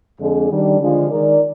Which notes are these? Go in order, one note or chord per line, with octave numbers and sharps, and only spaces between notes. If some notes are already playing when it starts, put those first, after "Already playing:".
F2 D3 G#3
D#3 G3 D4
D3 F3 G#3 D4 F4
D#3 G#3 D#4 A#4 D5